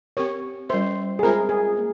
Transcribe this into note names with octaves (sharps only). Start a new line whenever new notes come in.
C4 G4 A#4 C#5
G3 C#4 F4 A#4 C5 E5
G#4
G#3 C4 F4 A#4 C5 E5
G#4
A#3 F4 A#4